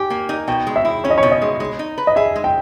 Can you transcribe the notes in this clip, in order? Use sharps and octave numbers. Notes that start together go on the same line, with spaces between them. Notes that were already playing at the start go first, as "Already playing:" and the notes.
Already playing: G4 G#5
A#3
D#4
B2 G5
G#3
E5
E4
C#4 C#5
D#5
C#5
B2
D#5
G#3
G#3
D#4
B4
D#5
G#4 E5
G#3
G5